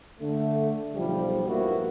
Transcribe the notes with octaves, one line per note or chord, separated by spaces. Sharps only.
D3 A3
B1 F3 G3
G2 A#2 A#3 B3 E4 F#4